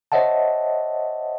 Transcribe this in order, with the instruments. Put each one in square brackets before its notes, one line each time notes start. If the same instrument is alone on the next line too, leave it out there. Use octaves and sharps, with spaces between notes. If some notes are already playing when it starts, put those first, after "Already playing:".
[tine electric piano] C5 C#5 D#5 E5 F#5 A5